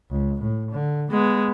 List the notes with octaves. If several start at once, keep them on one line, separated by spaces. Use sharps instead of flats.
C#2
A2
D3
G#3 B3